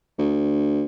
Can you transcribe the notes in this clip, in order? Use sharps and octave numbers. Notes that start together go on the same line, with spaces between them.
D2